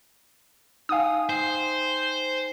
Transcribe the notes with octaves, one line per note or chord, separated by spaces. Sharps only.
D#4 F5 G5 G#5 D#6
C5